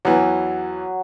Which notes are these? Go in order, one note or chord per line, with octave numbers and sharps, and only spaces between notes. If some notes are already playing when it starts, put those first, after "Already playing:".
E2 E3 F#3